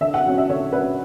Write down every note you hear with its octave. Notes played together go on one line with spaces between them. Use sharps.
D3 E5
F#5
F#3 C#4
E5
D3 C#5
F#3 C#4 B4